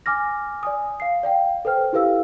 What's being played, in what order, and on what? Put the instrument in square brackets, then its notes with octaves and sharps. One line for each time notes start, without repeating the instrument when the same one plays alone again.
[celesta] G#5 D6 F6 A#6
D5 G#5 D#6
F5 C7
D5 F5 G5
A4 B4 C5 G5 F6
E4 G4 A4 B4 F5 E6